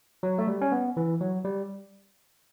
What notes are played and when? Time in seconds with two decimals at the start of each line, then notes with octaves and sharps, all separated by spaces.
0.23 F#3
0.38 A3
0.47 G3
0.61 C#4
0.72 B3
0.97 E3
1.21 F#3
1.44 G3